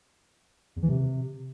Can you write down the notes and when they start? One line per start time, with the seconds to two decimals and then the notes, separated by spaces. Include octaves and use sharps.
0.76 E2
0.82 E3
0.89 C3